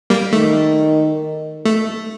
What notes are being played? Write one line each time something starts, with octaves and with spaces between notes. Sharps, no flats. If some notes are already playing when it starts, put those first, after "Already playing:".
G3 A#3
D#3 A3
A3